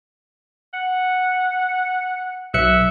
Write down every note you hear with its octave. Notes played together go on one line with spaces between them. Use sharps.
F#5
B1 E5 F#6 C#7